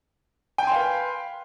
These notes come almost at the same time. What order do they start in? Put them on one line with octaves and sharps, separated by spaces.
G5 G#5 C6 F5 B4